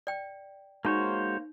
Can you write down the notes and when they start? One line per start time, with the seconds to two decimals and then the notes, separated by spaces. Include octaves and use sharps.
0.07 D5 G5
0.85 G#3 A#3 D#4 F#4 C5 C#5